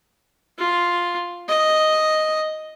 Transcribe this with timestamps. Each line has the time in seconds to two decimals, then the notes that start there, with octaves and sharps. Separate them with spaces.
0.58 F4
1.49 D#5